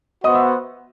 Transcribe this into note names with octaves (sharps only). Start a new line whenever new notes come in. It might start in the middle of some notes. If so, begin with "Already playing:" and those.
B3 F#4 C5 D#5 F#5 D#6
E5 E6